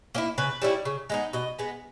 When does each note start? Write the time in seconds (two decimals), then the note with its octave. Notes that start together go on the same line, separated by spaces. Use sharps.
0.15 A#3 C#4 E4
0.38 C#3 B4
0.62 G3 C#4 E4
0.85 C#3
1.10 G#3 B3 D#4
1.33 B2 D#5
1.59 G#3 B3